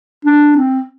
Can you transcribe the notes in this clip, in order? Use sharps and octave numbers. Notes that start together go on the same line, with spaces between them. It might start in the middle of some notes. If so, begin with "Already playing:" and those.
D4
C4